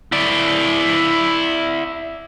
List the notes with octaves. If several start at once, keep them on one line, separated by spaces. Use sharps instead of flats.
E4 D5